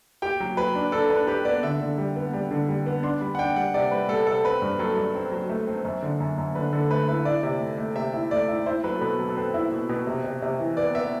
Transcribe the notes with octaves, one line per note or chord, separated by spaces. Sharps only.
G4 G5
F#3
F#3 B4
D4
D4 A4
D4 B4
G4 B4
B3 D5
D3 E5
D3
G3
B3
G3
D3
G3
B3
D4 C6
G3 B5
F#5
D4 G5
G3 F#5
C3 D5
G3 B4
G3 A4
C3 A4
C4 B4
G2
F#3 A4
G2
C4
F#3
A3
C4
F#2
D3
F#2
F#2
D3 B4
D3 A4
A3 B4
E4 B4
E4 D5
C3
A3
A3
C3 E5
E4
A3 D5
E4
E4 C5
F#3 B4
A4
B2 B4
F#3 A4
A4
C4 B4
E4
B2
B2
C3
C3
C3
E3
B3 D5
B3 E5